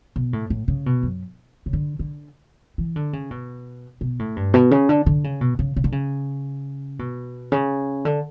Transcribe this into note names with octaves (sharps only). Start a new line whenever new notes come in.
B2
A2
A2
C#3
B2
F#2
C#3
D3
D3
E3
D3
C#3
B2
B2
A2
G2
B2
C#3
D3
D3
C#3
B2
C#3
C#3
D3
C#3
B2
C#3
D3